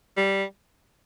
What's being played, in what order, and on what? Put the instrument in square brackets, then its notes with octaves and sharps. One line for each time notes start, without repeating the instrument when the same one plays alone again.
[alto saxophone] G3